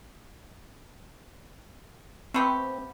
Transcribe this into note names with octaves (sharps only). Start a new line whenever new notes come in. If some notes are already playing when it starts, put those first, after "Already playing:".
A3 B3 C4 G4